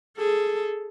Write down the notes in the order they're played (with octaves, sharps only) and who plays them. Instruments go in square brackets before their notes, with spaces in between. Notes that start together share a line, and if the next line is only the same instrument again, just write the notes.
[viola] G#4 A4